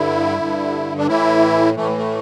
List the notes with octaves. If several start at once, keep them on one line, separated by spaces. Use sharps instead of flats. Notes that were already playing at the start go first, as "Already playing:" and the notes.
Already playing: G2 D3 E4
G2 D3
D4
A2 E3 E4
A2 E3 A3
A3